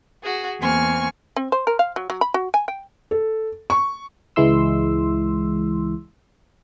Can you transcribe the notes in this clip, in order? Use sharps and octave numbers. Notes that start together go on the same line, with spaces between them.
F#4 G#4
E2 A#3 C4 G#5 C#6 F6
C4
C5
A#4
F5
F#3
F#3
B5
F#4
G#5
G5
A4
C#6
C#2 E3 G#3 E4 C6 E6